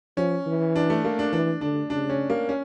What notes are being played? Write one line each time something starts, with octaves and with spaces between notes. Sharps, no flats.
F3 C#4
E3
D4
A3
A#3
D4
E3 D4
D3 D4
C#3 D4
C#4
A#3
C#4